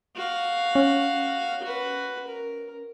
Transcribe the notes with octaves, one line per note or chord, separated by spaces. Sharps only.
F#4 F5
C#4
F#4 B4
A#4